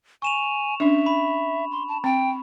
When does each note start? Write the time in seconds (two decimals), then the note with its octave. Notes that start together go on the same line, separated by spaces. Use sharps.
0.22 G#5 C#6 E7 F7
0.80 C#4 D4 E5
1.06 B5
1.71 C6
1.88 A5
2.04 C4 G5